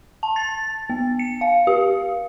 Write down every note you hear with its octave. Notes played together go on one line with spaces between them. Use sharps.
A5
A6
B3
C#7
F5
G4